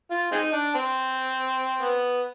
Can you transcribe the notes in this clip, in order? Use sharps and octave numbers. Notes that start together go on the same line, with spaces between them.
F4
G#3 C4 D#4
D4
C4
B3